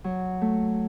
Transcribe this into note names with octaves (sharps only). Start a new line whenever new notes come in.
F#3
A3